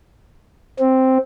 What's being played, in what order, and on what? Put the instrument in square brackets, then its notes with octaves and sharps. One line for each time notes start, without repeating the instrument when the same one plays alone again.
[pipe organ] C4